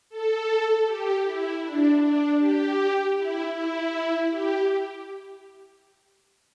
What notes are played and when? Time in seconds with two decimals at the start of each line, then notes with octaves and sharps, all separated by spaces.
0.10 A4
0.85 G4
1.25 E4
1.62 D4
2.00 D4
2.39 G4
3.16 E4
3.54 E4
4.31 G4